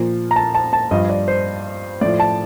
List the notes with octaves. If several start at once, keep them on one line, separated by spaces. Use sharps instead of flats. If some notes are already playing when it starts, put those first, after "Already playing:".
Already playing: A#2 F3
A#5
A5
A5
A5
G2 F3 D#5
D5
C5
A2 F3 D5
A5